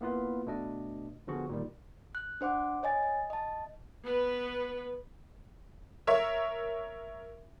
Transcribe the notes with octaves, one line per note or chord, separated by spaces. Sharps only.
A#3 B3 E4 F4 B4
B2 A3 D4 D#5
D3 F3 B3 F#4 G#4
A#2 D#3 G3
F#6
D4 C5 F#5 D6
C#5 D#5 G#5 A6
D#5
D#5 A5
B3 B4
A#4 C#5 E5